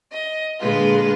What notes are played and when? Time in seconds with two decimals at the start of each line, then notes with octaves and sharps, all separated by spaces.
0.11 D#5
0.60 A#2 D3 G#3 F4 B4